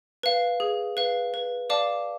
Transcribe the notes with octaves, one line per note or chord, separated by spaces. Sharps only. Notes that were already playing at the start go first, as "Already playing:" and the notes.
B4 F5
G#4
B4 F5
B4
D5 F5 A5 D6